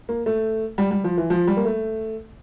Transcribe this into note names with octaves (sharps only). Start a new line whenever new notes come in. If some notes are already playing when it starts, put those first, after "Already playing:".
A#3
A3
G3
G3
F3
E3
F3
G3
A#3
A3